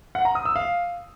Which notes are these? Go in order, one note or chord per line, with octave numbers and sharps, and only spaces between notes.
F#5
A#5
D#6
E6
F5